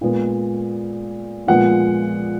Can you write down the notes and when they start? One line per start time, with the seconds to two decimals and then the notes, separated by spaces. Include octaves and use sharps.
0.01 A#2 G#3 B3
1.47 A#2 F3 G#3 B3 F#5